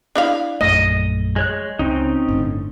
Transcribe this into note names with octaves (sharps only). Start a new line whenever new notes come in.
D4 E4 F5
A#1 F#2 A3 D#5
G#3 C#5 F#6
C#2 C4 C#4 D#4
G1 A2 D3